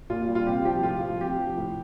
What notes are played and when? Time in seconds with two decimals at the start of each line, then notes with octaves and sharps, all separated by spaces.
0.10 A#2 F4
0.28 G3
0.35 F4
0.46 C3 G4
0.65 F3 G4
0.83 A2 F4
1.02 F3
1.20 C3 G4
1.39 F3
1.57 A2